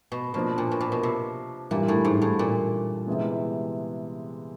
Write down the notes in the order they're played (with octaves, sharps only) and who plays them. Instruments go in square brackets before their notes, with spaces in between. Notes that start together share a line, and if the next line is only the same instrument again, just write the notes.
[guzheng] B2
[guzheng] B2 [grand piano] F3 A#3 D4
[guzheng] A#2
B2
A#2
B2
C3
[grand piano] G2 E3 G3 [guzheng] A#2
[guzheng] A2
G#2
A2
A#2
[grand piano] C3 E3 G#3 B3